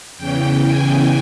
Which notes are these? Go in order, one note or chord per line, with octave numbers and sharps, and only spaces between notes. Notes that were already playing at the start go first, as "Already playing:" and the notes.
E2 C#3 E3 G5
G#5